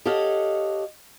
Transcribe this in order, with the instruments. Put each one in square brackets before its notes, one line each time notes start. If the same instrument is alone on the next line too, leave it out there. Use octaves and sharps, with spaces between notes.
[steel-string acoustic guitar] G4 A4 C#5 D#5 F5 F#5